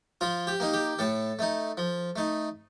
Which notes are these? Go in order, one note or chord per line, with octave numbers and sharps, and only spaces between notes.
F3 F4
G4
A#3 D#4
G4
A2 A4
A3 D#4
F3
A3 D#4